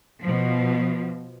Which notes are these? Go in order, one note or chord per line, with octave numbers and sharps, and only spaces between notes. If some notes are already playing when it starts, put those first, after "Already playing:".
B2 F3